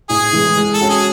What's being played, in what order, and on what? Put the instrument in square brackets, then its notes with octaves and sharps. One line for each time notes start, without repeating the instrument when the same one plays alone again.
[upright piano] A2 [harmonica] G#4
[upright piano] E3 G#3
G#3
[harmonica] A4
[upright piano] C#4 F#4
[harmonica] G#4